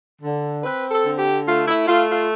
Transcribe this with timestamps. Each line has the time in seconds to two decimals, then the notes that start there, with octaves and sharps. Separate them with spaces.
0.22 D3
0.63 C4 B4
0.91 A4
1.06 D3
1.18 G4
1.47 A3 F4
1.67 E4
1.87 A3 F4
2.09 F4